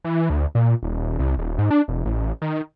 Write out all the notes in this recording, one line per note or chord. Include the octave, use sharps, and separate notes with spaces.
E3
D2
A#2
D#1
C2
D#1
G#2
D4
E1
A1
D#3